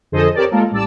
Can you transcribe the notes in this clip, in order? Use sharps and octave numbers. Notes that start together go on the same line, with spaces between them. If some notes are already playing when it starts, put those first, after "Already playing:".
F2 D3 G#4 A4 C5 D#5
C4 G4 A#4 C#5 D5 A5
G#3 A#3 F4 A4 A#4
A1 G3 D5 A5 E6